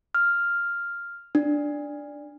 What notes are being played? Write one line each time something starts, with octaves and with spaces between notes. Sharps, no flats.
F6
D4